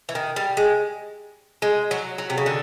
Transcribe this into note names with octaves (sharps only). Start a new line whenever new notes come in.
E3
D#3
G3
G#3
G#3
F#3
F#3
C3
C#3
D3